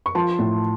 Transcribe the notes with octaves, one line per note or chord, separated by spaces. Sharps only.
C#6
F3 A5 C6
A2